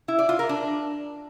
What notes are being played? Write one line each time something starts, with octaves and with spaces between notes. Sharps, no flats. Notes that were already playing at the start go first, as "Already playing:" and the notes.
E4
D5
F4
A#4
D4